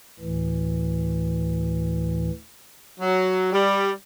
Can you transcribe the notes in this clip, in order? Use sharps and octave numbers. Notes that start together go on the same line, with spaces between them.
D2 A2 E3
F#3
G3